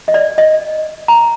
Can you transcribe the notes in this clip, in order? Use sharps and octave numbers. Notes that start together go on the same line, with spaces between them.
D#5
D5
D#5
A#5